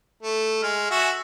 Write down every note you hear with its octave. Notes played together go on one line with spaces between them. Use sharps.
A3
G#3 F6
F#4 E5 G#5